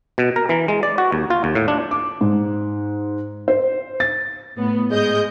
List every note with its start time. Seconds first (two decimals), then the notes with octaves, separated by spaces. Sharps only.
0.18 B2
0.36 A#4
0.49 E3
0.68 G#3
0.83 D5
0.98 F#4
1.12 D#2
1.30 F4
1.44 D#2
1.55 A2
1.68 D4
1.91 D6
2.21 G#2
3.48 C5
4.00 A6
4.57 A2 B3
4.90 G#2 G#3 D#5 G6